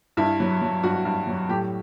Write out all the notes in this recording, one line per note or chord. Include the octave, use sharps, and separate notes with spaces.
G2 E4
F#3
F#3
G2 F#4
G2
F#3
A2 G4